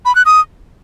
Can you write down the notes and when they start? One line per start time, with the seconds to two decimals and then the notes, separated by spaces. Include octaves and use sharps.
0.05 B5
0.15 F#6
0.26 D#6